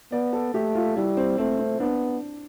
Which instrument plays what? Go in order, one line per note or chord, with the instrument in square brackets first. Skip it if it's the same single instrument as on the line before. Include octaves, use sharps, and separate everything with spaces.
[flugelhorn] B3 [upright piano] D5
[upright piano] A4
[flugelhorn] A3 [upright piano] G4
[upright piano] F4
[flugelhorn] G3 [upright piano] E4
[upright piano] C4
[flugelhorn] A3 [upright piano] C4
[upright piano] C4
[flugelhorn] B3 [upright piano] D4